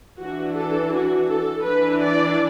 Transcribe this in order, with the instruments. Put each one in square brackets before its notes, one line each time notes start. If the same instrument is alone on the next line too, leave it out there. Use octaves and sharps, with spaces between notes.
[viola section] E3 D4 F#4
A4
F#4
A4
E3 D4 B4
D5